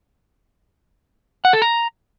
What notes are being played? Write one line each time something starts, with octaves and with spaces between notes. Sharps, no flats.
F#5
A4
A#5